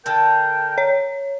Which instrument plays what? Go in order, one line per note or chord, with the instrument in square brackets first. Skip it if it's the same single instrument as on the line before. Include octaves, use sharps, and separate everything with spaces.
[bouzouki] D3 A4 [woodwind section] A#4 G5
[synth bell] C#5